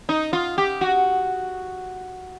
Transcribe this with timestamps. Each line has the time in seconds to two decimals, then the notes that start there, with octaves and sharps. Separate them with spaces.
0.09 D#4
0.33 F4
0.58 G4
0.81 F#4